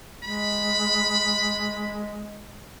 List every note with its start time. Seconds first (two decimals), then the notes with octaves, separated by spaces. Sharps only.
0.24 G#3 B5